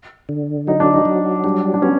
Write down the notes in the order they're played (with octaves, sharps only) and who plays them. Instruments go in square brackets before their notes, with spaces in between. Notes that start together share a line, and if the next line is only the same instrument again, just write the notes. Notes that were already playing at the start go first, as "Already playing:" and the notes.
[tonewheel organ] D3
[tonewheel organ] F#3 [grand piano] D#4
[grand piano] D4
D#4
[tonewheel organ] F#3
[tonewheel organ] G3 [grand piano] D4
[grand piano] D4
[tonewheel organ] B3 [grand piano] C#4